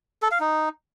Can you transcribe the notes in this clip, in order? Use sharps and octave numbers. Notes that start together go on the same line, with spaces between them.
A4
F5
D#4